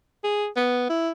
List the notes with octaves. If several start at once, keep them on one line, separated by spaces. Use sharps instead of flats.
G#4
B3
E4